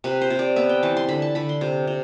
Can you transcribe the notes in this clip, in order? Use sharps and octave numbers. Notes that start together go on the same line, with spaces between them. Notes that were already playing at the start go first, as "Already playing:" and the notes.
C3 B4
C5
C3
D5
B3 E5
G5
E3 A5
C6
D3 B5
A5
D3 B5
C6
C3
C3